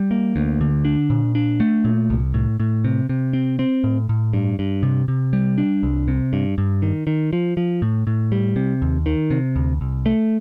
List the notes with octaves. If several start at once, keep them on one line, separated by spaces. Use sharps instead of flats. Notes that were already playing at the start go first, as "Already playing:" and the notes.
Already playing: G3
A#3
D2
D3
D4
A#2
D4
A3
A#2
C2
A2
A2
C3
C3
C4
C4
A2
A2
G2
G2
C3
C3
G3
D4
C2
C3
G2
G2
D#3
D#3
F3
F3
A2
A2
G3
C3
D#2
D#3
C3
D2
C2
A3